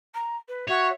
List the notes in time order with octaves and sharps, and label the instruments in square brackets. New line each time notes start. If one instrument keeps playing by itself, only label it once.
[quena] A#5
B4
[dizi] F#4 [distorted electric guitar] C#5 [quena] E5